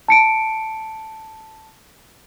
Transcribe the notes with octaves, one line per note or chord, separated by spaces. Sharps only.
A5 C#7 D7